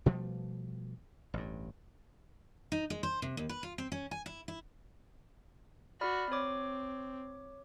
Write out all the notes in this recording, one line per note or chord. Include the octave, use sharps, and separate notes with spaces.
B2 F3 G3 A3
A1 G2
D#4
G#3
C5
C3
D#2
B4
F4
C4
C#4
G#5
E4
E4
F#4 D5 B5 F6
C4 C#5 D6